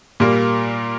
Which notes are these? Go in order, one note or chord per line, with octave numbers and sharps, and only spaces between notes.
A#2 G3 A#3